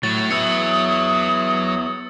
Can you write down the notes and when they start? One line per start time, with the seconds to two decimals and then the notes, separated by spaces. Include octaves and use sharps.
0.03 A2 F#3 A6
0.31 B3 E4 D#6 E6 C#7